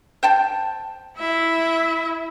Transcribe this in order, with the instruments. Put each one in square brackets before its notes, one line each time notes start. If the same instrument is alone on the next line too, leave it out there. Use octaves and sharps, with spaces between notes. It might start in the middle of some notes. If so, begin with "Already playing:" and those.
[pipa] C5 G5 A5
[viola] E4 E5